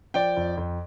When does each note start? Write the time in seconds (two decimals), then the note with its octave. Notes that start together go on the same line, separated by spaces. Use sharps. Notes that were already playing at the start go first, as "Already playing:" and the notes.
0.14 F3 D5 G5
0.37 F2
0.57 F2